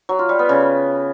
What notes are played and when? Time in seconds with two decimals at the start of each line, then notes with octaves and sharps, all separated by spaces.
0.09 F#3
0.19 F4
0.29 G3
0.39 B3
0.49 C#3